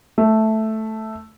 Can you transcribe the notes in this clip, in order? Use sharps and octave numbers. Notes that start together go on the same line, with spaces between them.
A3